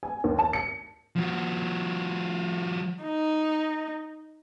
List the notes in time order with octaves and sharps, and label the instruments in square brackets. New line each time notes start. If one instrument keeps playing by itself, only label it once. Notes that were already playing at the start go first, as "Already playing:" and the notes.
[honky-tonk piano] G#5
D#2
A5
C#7
[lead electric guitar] F3 F#4
[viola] D#4